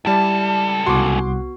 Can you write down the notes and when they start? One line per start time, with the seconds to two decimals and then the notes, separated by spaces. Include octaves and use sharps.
0.05 C#2 G3 E4 A4 D5 A5
0.86 C2 B3 F#4 F#5 C6 D6